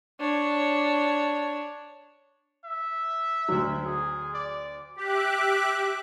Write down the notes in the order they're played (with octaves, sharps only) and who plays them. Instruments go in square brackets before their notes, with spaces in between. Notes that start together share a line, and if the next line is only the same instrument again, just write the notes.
[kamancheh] D4 C#5
[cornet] E5
[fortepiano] D2 F#3
[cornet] G#4
D5
[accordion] G4 [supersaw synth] E5 D6 F#6